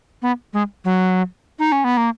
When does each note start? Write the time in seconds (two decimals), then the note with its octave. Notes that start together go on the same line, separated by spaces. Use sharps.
0.22 B3
0.53 G#3
0.85 F#3
1.59 D#4
1.72 C#4
1.84 B3
1.97 A#3